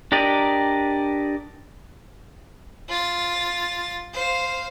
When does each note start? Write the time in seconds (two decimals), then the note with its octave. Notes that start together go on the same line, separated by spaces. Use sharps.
0.12 D4 G4 A#4 D5 D#5
2.89 F4 A6
4.13 C5 F5